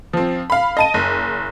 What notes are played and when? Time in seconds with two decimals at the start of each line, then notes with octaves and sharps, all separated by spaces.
0.13 F3 C4
0.50 F5 B5
0.77 D#5 A5 D#7
0.94 F#1